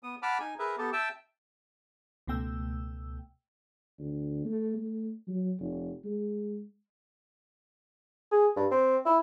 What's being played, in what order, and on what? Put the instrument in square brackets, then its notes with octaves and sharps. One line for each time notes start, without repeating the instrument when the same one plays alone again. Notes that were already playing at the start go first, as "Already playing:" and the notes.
[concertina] B3 D#6
F#5 A5 B5 D6 F6
D#4 G#5
G#4 A#4 B4 E5
B3 G4 A4
E5 G5 A5 E6
[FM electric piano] C#2 B2 A3 G5 E6
[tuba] D2
A3
A3
F#3
F1
G#3
[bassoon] G#4
G2
C4
E4